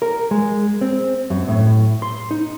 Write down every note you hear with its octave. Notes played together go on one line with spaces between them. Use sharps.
A#4
G#3
C4
F#2
A2
C6
D#4